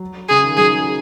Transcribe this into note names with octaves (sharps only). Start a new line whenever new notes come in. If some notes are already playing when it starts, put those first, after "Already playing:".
Already playing: F#3
C#3 G#4
D#3
F#3 G#4